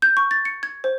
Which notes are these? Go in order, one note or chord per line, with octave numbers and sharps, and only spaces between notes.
G6
C#6
A6
C#7
G#6
C5